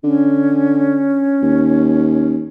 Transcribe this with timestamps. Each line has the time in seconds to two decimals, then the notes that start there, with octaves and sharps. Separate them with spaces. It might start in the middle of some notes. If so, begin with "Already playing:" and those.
0.04 D3 C#4
1.42 D#2